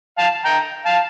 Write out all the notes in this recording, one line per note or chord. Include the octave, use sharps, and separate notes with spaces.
F5 A5
G5 A#5
F5 A5